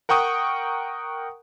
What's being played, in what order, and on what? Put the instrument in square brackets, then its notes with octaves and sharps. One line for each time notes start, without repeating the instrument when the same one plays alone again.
[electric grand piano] A#4 F#5 G5 C#6 D#6